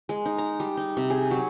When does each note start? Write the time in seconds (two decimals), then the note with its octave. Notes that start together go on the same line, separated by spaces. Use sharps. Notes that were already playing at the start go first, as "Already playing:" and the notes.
0.09 G#3
0.26 D#4
0.38 A#5
0.60 G3
0.77 D#4
0.97 C3
1.10 G#4
1.31 F#3